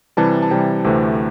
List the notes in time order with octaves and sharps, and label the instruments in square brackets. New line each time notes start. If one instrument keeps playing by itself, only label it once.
[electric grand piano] C3 E3 G3 A5
A5
C3 E3 G3 G5
D2 C3 E3 A3 C4